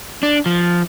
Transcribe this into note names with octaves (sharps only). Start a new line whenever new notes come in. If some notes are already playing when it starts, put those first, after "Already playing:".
D4
F3